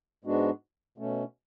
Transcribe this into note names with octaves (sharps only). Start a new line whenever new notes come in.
G#2 G#3 B3 D4 F#4
B2 A3 C#4